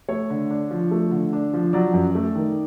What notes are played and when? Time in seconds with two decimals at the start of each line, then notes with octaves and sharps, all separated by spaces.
0.09 A3 C#5
0.30 D3
0.51 D4
0.71 F3
0.91 A3
1.11 D3
1.33 D4
1.53 F3
1.73 F#3 D5
1.93 F#2
2.15 A3
2.35 D#3